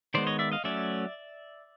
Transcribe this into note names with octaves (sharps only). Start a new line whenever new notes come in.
D#3 G#3 B3 C5 D5
C#5 D#5
D5 E5
D#5 F5
F#3 A3 C#4 D5 E5